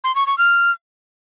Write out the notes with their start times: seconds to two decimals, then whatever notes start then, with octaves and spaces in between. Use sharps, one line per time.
0.04 C6
0.15 C#6
0.27 C#6
0.38 F6